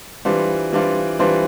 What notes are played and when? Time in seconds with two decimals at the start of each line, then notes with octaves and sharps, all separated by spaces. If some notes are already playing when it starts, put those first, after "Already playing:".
0.25 E3 G3 D4 F4 C5
0.72 E3 G3 D4 F4 C5
1.19 E3 G3 D4 F4 C5